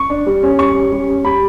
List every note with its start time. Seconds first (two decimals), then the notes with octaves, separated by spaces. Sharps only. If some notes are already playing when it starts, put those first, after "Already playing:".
Already playing: C#6
0.10 D4
0.26 G3
0.43 C#4
0.59 G3 C#6
0.75 C#4
0.92 G3
1.08 C#4
1.24 G3 B5